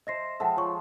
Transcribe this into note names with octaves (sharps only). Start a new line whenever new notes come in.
C5 D#5 E5 A#6 C7
F3 G#3 A4 E5 F#5 G5
F4 C#5 C#6